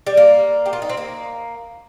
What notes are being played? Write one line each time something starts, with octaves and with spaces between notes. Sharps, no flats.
G3
A#3
G4
F4
D#4
C4
A#3